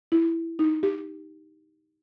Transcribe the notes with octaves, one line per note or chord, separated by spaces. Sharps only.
E4
D#4
G4